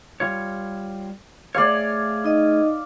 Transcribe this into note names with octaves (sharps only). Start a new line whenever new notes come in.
G3 F4 C#5
A3 G#4 C#5 D5 F5
D#4 D#5